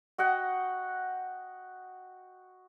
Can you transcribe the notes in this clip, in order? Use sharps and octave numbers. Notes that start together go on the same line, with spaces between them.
F#4 D#5 F#5 G5